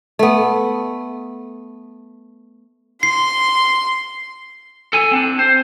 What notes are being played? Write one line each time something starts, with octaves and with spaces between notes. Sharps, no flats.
A3 B3
C6 C7
A4 G#5
C4 D4
C5